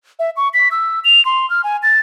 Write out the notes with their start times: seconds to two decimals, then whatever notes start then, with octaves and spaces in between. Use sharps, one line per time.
0.19 E5
0.37 C#6
0.54 B6
0.71 E6
1.04 F7
1.25 C6
1.50 F6
1.64 G#5
1.83 A6